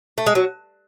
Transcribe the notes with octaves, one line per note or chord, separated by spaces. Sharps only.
A3
G#3
F#3